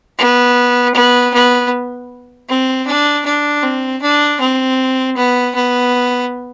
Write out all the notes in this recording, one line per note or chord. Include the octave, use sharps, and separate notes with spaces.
B3
B3
B3
C4
D4
D4
C4
D4
C4
B3
B3